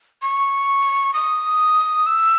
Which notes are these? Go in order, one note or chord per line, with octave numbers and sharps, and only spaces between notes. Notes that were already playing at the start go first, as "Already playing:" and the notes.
C#6
D#6
E6